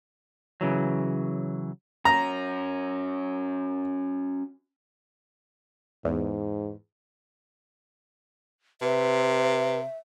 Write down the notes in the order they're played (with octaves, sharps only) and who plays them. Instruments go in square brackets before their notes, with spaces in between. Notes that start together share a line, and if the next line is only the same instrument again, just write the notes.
[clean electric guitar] C#3 E3 F#3
[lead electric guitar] C#4 F#4 [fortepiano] A#5
[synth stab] E2 [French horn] G#2
[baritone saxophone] C3 [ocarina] B4 [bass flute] E5